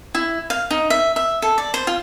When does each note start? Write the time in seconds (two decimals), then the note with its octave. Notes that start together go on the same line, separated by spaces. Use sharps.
0.15 E4
0.50 F5
0.71 D#4
0.90 E5
1.16 E5
1.42 A4
1.58 D5
1.74 C5
1.87 F4